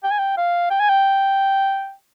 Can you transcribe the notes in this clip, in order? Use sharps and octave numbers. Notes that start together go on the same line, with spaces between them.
G5
G#5
G5
F5
G5
G#5
G5